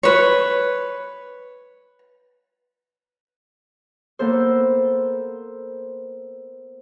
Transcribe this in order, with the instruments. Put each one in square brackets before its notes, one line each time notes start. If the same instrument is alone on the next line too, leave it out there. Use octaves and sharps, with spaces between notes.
[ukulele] B4 C#5
[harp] A#3 B3 A4 C5